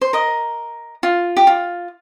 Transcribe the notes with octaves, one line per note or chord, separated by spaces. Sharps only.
C5
A#4 D#5
F4
G4
F4